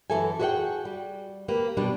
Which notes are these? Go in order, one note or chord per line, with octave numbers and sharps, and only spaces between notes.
F#2 E3 F#4 A4 E5 G#5
F#4 G#4 B4 D#5 F#5 G5
G3
A#3 G4 B4
B2 G3 D4